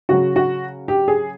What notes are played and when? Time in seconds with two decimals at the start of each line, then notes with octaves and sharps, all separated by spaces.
0.09 C#3 F#3 F#4
0.36 F#4
0.88 G4
1.08 G#4